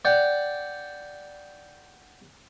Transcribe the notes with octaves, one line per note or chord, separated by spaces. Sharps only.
D5 F#5 G5